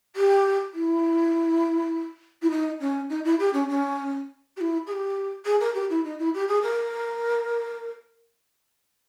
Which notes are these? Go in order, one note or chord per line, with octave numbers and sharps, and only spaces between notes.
G4
E4
E4
D#4
C#4
D#4
E4
G4
C#4
C#4
G4
E4
G#4
G4
G#4
A#4
G4
E4
D#4
E4
G4
G#4
A#4